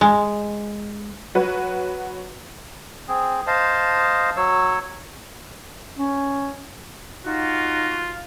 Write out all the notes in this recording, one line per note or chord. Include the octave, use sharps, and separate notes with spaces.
G#3
F#3 F#4 B4
C4 G#4
C5 D#5 F5 A5
F#3 C#5 E6
C#4
D#4 F4 F#4